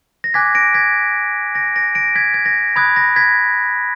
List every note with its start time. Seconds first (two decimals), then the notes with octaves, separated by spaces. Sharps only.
0.24 A#6
0.34 G#5 D6 F#6 G#6 B6
0.55 A#6 D7
0.74 G#6 B6
1.55 A#6 D7
1.76 A#6 D7
1.95 A#6 D7
2.15 G#6 B6
2.34 G#6
2.46 A#6
2.76 B5 D#6 F#6 G#6
2.96 A#6
3.16 G#6 B6